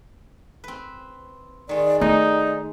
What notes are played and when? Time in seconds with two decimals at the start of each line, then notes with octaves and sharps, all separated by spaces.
0.64 C4 B4
1.69 D#3 G#3 D5
2.01 A3 D#4 D5